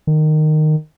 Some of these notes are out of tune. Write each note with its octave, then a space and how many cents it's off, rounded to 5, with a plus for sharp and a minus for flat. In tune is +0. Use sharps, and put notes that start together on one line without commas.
D#3 -15